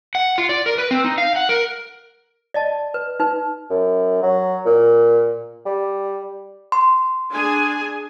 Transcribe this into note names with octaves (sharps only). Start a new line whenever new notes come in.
F#5
F4
D5
A#4
B4
C4
D#4
F5
F#5
A#4
D5 D#5 A5
B4
D#4 B4
F#2
F#3
A#2
G3
C6
D4 G#4 G#5